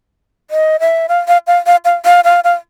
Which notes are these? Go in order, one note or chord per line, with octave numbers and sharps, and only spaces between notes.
D#5
E5
F5
F5
F5
F5
F5
F5
F5
F5